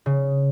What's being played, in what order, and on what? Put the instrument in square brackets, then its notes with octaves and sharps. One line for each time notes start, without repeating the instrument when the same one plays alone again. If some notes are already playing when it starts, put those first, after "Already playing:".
[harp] C#3